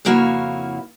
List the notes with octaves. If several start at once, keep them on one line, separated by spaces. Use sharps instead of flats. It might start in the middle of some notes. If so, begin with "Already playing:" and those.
F2 C#3 A#3 E4 F#4 F5